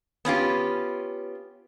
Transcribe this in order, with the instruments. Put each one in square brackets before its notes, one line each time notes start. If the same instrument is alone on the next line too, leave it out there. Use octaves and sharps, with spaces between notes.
[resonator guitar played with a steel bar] B3 C#4 F4 G4